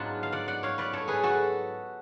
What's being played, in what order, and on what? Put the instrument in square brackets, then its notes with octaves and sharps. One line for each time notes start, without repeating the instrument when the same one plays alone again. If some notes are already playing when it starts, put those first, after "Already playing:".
Already playing: [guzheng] G#2 F#3 B3 D4 F4 F#5 A5
F5
D5 F#5
D5 F#5
C#5 F5
B4 D5
A4 C#5
G#4 B4
F#4 A4